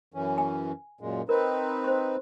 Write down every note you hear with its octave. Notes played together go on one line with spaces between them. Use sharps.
F#2 E3 C#4
G#5
F#2 A#2 G#3
C4 D#4 A#4 B4
C5 C6